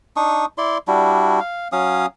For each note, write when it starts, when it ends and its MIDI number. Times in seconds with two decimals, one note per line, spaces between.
0.16 0.45 62
0.16 0.45 63
0.16 0.45 85
0.16 0.45 87
0.58 0.78 64
0.58 0.78 74
0.58 0.78 84
0.88 1.40 55
0.88 1.40 62
0.88 1.40 64
0.88 1.40 66
1.40 1.68 77
1.72 2.06 54
1.72 2.06 61
1.72 2.06 77
1.72 2.06 87